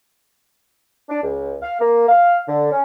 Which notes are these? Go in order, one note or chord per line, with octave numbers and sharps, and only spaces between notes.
D4
C#2
F5
A#3
F5
D3
C#4